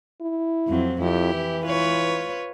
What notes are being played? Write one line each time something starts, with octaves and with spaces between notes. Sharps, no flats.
E4
F2 F#3 C4
F2 E4 G4
E3
F4 B4 C#5